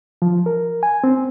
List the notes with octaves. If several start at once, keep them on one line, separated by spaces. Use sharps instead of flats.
F3
A#4
G#5
C4